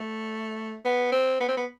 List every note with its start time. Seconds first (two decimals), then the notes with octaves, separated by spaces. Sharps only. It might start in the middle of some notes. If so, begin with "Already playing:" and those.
Already playing: A3
0.85 B3
1.12 C4
1.40 B3
1.48 C4
1.57 B3